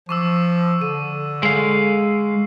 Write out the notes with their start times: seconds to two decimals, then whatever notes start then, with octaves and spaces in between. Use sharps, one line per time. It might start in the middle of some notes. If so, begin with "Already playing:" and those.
0.09 F3 C#6 D6 E6
0.82 D3 D#7
1.43 G#3 F5 E6 C7